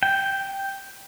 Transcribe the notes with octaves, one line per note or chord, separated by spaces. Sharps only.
G5